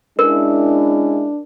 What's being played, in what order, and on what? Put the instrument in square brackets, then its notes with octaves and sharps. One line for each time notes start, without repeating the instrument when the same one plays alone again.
[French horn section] G#3 C#4 E4 [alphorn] D4 [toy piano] A#4